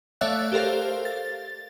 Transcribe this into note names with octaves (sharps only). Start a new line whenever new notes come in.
A3 C#5 D5 E5 F5 F#6
G4 A4 A#4 C5 F5
A6